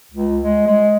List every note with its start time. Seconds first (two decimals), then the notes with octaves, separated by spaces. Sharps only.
0.11 C#2
0.42 G#3
0.66 G#3